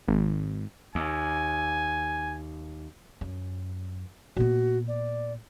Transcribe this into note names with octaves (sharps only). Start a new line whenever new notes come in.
G#1
D#2 G#5
F#2
A#2 B3 F#4
D5